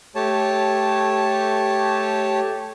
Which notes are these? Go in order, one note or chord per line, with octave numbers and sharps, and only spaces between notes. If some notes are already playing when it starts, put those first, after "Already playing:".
A3 G4 C#5 A5